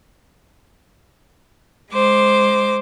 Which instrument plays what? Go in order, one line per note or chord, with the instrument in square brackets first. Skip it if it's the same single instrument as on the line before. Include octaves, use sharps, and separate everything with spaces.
[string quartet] G#3 C5 D6